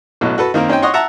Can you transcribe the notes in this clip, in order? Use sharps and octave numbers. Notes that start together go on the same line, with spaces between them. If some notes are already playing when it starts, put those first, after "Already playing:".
A1 B2 F#3
F#4 A4 B4
D#3 A#3 C4 A#4
C4 C#4 D#4 C5 G5
C#5 D#5 F#5 C6 C#6
E5 F#5 A5 A#5